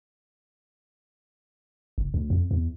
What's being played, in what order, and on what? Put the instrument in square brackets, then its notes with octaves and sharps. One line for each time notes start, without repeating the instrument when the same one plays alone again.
[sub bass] F#1
D2
F2
E2